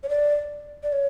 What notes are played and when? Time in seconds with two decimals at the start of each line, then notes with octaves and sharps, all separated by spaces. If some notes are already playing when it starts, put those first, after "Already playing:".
0.03 C#5
0.09 D5
0.83 D5
0.92 C#5